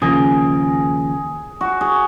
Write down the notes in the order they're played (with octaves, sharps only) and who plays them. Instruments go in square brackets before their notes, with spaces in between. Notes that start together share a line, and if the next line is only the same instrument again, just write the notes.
[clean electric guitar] D#2 C#3 F3 A#3 [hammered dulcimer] G#4
[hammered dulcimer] F#4
G#4